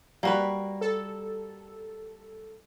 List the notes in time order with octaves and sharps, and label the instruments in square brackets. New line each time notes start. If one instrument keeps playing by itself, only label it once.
[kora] G3 [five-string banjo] A#3 F#4 B4
[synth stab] A4